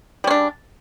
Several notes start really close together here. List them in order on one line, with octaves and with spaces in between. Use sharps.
G3 C#4 D4 C#3